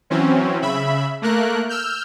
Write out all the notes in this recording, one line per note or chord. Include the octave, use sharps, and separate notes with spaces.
E3 F#3 C4 C#4
C#3 E5 B5
A3 A#3 A#4 F#6
E6 F6 G6